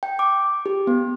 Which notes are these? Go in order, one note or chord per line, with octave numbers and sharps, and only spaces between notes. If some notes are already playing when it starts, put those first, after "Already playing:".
G5
D6
G4
B3